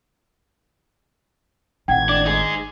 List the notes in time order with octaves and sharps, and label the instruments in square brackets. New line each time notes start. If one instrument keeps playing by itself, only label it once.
[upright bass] G#1 A2 [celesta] F#5 G5 [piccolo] G#6
[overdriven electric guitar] D4 [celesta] D6
[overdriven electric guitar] D#4 G#4